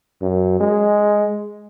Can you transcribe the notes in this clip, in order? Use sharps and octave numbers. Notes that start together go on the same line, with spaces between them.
F#2
G#3